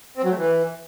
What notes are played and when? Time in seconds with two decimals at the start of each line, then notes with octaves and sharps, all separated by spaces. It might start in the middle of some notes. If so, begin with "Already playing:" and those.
0.17 C4
0.24 F#3
0.30 A3
0.37 E3